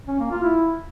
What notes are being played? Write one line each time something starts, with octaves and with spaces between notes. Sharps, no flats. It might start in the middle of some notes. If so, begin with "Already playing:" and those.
C#4
A#3
F4
E4